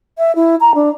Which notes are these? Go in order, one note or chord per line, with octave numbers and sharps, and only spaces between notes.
E5
E4
A#5
D4